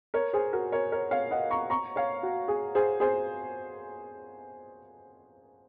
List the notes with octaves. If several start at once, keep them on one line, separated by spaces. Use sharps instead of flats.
A#4 C#5
G#4 C5
F#4 A#4
A#4 C#5
A#4 C#5
C#5 F5
D#5 F#5
A#5 C#6
A#5 C#6
C#5 F5
F#4
G#4
G#4 C5
G#4 C5